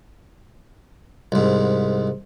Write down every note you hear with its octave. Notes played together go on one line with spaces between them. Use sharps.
C2 G#2